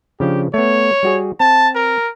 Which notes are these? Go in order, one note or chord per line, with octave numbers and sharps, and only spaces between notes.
C#3 F3 D4 G4
A3 B3 C#5
G3 F#4 G#4
C4 A5
A#4